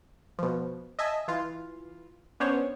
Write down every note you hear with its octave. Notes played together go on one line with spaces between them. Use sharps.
B2 F3
D#5 E5 G#5 A5
E3 F4
B3 C#4 D4 C5 C#5